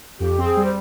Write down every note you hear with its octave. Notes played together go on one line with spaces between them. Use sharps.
F2 G4
C4
G#4
G3
C5